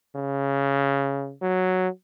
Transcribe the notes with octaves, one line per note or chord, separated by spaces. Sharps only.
C#3
F#3